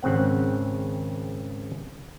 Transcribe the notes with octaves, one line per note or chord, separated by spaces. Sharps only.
G#1 C#3 C4 F#5